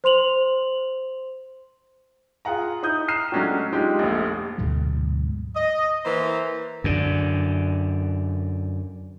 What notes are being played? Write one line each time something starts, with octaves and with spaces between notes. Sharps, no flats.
C5 C6 F7 F#7
F4 G#4 F5 F#5 A#5
D#4 E4 D#6 G6
A#5 F6 C7 D#7 E7
F#3 G#3 A3 C#4 D4 F#4
G#3 D4 D#4 F4 G4
F1 A#1
D2 G#2 B2 F#3
D#5
E3 A#3 C5 A#5
F#2 D3